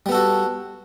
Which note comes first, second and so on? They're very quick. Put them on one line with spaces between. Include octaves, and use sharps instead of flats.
G3 B3 A4 F#4